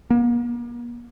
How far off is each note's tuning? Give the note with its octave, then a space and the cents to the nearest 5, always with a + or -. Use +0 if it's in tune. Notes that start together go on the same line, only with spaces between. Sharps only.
A#3 +40